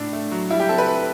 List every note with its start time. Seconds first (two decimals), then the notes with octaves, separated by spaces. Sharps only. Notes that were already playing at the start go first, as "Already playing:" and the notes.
Already playing: A2 D4
0.13 A3
0.31 F#3
0.50 G3 E4
0.60 G4
0.69 C4 A4
0.78 B4
0.88 E4